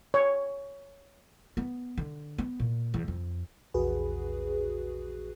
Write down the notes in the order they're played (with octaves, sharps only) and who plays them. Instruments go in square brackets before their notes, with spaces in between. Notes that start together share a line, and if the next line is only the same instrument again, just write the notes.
[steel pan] C#5
[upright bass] B3
D3
B3
A#2
E2
F2
[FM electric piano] A#1 E2 F#4 G#4 B4